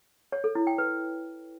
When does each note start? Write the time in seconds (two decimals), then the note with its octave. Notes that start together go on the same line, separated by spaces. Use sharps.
0.32 C#5
0.44 A4
0.55 E4
0.67 G5
0.78 B4